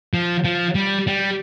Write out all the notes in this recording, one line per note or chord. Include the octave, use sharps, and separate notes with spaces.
F3
F3
G3
G3